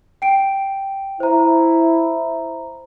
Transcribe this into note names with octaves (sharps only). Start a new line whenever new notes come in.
G5 D7
E4 C5 A#5